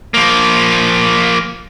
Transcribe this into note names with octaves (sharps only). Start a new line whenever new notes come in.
F3 A#3